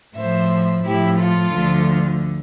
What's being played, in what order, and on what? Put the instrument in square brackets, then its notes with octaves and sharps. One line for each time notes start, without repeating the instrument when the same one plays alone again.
[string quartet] A2 F3 C5 E5
A2 F3 E4 G4
F4 A4
D2 D3 F3